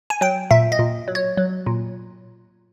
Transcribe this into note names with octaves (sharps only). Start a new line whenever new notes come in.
G#5
F#3 G5
A#2 E5
D#5
A#2
F#3
C#5
F#3
A#2